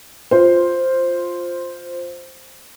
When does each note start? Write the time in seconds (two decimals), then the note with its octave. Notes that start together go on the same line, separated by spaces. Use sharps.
0.31 F4 C5